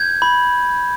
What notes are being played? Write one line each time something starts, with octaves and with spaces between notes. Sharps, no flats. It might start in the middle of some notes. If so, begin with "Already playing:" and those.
Already playing: G6 G#6
B5